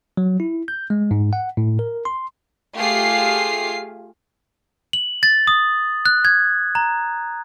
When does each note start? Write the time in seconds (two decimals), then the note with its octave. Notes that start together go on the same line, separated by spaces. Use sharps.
0.17 F#3
0.40 E4
0.68 G6
0.90 G#3
1.11 G#2
1.33 F#5
1.57 A2
1.79 A#4
2.05 C6
2.78 A3 F4 G4 G#4 F5 C7
4.93 F#7
5.23 A6
5.47 D#6
6.06 F#6
6.25 G#6
6.75 A#5